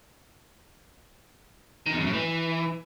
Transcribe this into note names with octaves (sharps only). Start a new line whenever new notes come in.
D#3
E2
F#2
A2
E3